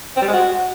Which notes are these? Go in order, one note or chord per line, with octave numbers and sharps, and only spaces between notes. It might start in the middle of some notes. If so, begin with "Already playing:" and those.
C4
G3
G#3
F#4